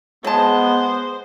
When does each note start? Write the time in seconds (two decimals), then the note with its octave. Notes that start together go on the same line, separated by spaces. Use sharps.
0.24 F#3 G#3 B3 C5 A5